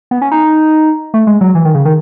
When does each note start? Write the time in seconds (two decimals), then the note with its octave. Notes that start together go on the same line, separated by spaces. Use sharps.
0.11 B3
0.22 C#4
0.32 D#4
1.14 A3
1.27 G#3
1.41 F#3
1.55 E3
1.65 D#3
1.75 C#3
1.85 D#3